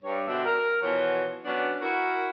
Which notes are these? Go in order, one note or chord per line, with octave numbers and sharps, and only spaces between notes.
G2 C#5
B2 D3 C4 D4 F#4 E5
A#4
B2 E3 F3 F#4 C#5
F#3 B3 C#4 D4
E4 F#4 A#4